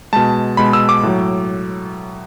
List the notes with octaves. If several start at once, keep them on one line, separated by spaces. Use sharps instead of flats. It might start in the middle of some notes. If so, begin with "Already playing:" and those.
B2 G#3 A5
B2 G#3 B5
E6
D6
A2 F#3